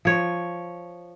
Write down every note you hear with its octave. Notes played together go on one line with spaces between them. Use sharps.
F3 C#5